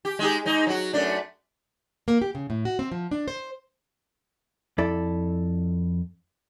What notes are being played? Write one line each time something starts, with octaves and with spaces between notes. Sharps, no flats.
G4
G#3 D#4 G4
G#2 D#4 D#5
F#3 F#4
F#2 A3 D4
A#3
G4
C#3
A2
F#4
C4
F3
D4
C5
F2 E4 A4 D5